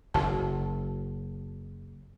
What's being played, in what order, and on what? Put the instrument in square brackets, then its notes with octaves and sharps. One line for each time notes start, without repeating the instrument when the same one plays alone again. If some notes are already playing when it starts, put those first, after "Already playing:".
[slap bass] F#1 F#2 [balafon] A5